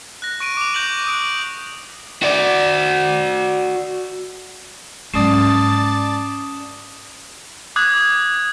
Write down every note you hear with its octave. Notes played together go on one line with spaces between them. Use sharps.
F#6 A#6
C#6 D7 D#7
D6 F7
G6 A#6 D#7 F#7
D#6 F#6 D7
F#4 D5
G#2 F#3 C#4 D5 A5 D#6 C7
D6 D#6 F#6 G#6